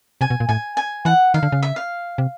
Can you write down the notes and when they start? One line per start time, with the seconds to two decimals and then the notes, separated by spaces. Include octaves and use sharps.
0.21 C3 G#5
0.30 B2
0.40 A#2
0.49 A2 G#5
0.77 G#5
1.05 E3 F#5
1.34 D#3 F5
1.43 D3
1.52 C#3
1.63 E5
1.76 F5
2.18 C3